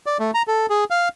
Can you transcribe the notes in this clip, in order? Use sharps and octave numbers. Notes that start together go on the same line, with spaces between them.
D5
A3
A#5
A4
G#4
F5